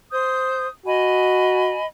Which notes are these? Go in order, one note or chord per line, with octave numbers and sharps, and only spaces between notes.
C5 D#6 G6
F#4 D#5 G#5 B5